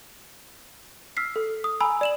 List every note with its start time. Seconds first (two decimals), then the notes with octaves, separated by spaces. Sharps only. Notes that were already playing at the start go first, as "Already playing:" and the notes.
1.17 E6 F6 B6 C7
1.36 A4
1.64 D#6
1.80 G#5 A#5 B5 E6
2.01 D5 E7 F#7